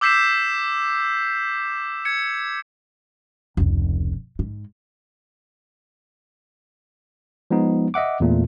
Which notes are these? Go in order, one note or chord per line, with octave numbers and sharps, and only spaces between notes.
D6 E6 G6 B6 C7 E7
G#6 C#7
F1 C#2
G#2
F3 G#3 B3 D#4
D#5 E5 F#5 D6
E2 A#2 A3